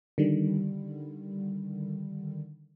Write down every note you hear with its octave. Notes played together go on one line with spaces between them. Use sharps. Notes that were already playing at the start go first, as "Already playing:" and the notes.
D3 D#3 G3